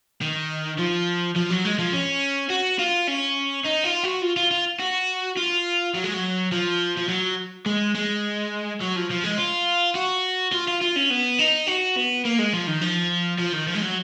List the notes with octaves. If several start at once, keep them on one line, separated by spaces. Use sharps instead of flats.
D#3
F3
F3
F#3
G#3
F3
C#4
F#4
F4
C#4
D#4
F4
F#4
F4
F4
F4
F#4
F4
F#3
G#3
F#3
F3
F3
F#3
G#3
G#3
F#3
F3
F3
G#3
F4
F#4
F4
F4
F4
C#4
B3
D#4
F#4
B3
A#3
G#3
F3
D#3
F3
F3
D#3
F3
G#3
F#3